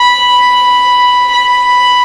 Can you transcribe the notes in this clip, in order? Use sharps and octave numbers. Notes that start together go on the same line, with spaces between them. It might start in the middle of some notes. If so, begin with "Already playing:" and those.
Already playing: B5
B5